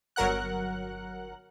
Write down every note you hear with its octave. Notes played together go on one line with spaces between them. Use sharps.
G1 F#3 A#4 F#5 F#6